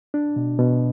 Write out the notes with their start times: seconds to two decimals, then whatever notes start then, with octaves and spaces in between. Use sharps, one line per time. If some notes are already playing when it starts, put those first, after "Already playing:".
0.14 D4
0.36 B2
0.59 B2